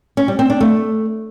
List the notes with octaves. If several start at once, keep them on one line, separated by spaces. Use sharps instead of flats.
C#4
G3
C4
D4
A3